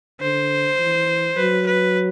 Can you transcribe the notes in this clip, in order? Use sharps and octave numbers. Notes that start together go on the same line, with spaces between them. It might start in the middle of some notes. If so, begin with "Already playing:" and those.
D3 C5
E3
F#3 B4
B4